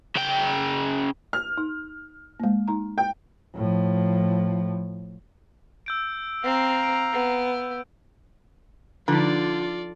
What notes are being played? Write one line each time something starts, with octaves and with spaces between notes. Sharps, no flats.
C#3 G5
F6
D#4
G#3 A#3
D#4 A#5
G5
A2 F3
E6 G6 D7
C4 F5 A#5
D7
B3
D3 F3 D#4 F4 D5